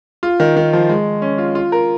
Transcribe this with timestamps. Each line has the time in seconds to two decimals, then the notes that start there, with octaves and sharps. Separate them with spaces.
0.23 F4
0.40 D#3
0.56 D#3
0.73 F3
0.89 G#3
1.22 C#4
1.38 F4
1.55 F4
1.72 A#4